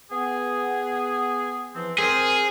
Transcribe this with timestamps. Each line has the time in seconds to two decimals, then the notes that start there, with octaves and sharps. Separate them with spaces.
0.11 B3 G#4
1.74 E3 F3 C4
1.98 C4 G#4 A#4 C5